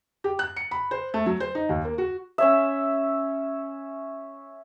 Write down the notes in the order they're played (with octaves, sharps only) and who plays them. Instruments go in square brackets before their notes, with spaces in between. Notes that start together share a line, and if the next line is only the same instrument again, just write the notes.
[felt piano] G4
F#6
C#7
B5
C5
A3
F#3
C5
D#4
D#2
A#3
F#4
[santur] C#4 C#5 E5